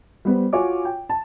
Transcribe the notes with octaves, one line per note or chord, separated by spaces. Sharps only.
G3 B3 C5
F4 F#4 C#5 G#5 D6
G5
A5